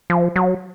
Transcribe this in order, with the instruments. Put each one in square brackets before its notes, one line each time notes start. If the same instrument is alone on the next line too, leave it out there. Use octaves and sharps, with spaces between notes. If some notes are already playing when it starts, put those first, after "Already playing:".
[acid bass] F3
F#3